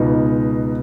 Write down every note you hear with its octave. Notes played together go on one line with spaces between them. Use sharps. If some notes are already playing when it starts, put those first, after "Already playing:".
Already playing: C#2 B2 D#4